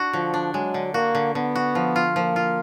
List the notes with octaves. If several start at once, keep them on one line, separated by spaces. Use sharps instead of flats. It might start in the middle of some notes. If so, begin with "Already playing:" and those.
Already playing: D4 F#4
D3 F3
D4
F#3 G#3
D3
A#3 F#4
D3
D3 B3
F#4
F3
F4
F3 A#3
F4